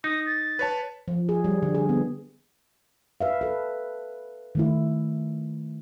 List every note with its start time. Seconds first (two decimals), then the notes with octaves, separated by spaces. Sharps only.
0.04 D#4 D#6
0.26 A6
0.59 B4 C#5 A5
1.08 F3
1.29 G#4
1.44 G3
1.62 D3
1.75 G#4
1.89 B3
3.21 B4 E5 F5
3.41 A4 B4
4.55 D#3 A3 E4